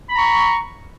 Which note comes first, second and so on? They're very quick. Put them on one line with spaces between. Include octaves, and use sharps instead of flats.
B5 A#5 C#6